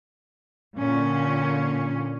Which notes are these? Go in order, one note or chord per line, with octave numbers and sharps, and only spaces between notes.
A#2 D3 C#4